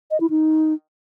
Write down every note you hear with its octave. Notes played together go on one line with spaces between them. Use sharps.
D#5
E4
D#4